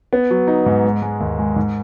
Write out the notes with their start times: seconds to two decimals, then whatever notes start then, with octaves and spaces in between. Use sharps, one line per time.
0.13 B3
0.30 F#3
0.47 D#4
0.66 G#2
0.84 G#3
1.02 G#3
1.20 D#2
1.39 G#3
1.56 G#2